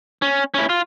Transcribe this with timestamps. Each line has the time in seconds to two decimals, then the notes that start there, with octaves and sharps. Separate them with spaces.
0.22 C#4
0.54 C#4 E4
0.70 F4